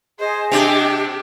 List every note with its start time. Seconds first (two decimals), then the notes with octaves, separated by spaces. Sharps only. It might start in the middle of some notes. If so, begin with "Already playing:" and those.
0.19 G#4 C5 D#5
0.52 C3 D4 G4